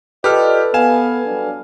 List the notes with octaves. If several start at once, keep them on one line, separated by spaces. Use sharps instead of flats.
F4 G4 A4 B4 D5 D#5 F6
B3 F5 G#5 E7
F#3 G3 D4